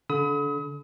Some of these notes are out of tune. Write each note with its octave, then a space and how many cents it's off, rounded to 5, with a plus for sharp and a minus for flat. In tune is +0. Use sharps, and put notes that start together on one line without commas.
D3 -30 B5 +25 D#6 +40